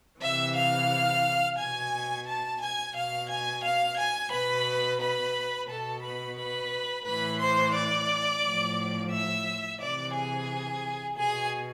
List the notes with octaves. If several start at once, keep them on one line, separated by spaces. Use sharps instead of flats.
C3 E3 E5 E6
F5 F6
B2 G#5 G#6
A5 A6
G#5 G#6
B2 F5 F6
G#5 G#6
F5 F6
G#5 G#6
B2 B4 B5
B4 B5
B2 A4 A5
B4 B5
B4 B5
A2 E3 B4 B5
C5 C6
D5 D6
A2 F3
E5 E6
C3 E3 D5 D6
G#4 G#5
B2 G#4 G#5